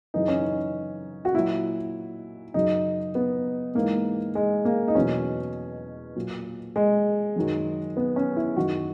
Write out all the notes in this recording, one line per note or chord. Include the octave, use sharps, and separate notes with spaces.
F#2 C#3 E3 D#4
C#4
D#4
F#4
A#2 F#3 E4
F#2 C#3 F#3 D#4
B3
G#2 E3 A#3
G#3
A#3
D#4
E2 B2 F#3 C#4
A#2 F#3
G#3
F#2 D#3 F#3
B3
C#4
E4
F#2 D#3 F#3 F#4